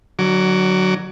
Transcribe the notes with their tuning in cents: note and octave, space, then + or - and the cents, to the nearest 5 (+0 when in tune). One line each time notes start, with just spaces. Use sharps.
D3 +35 F#3 +10 D6 -20